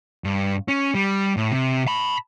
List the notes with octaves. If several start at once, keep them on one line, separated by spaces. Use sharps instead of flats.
G2
C#4
G3
A2
C3
A5 B5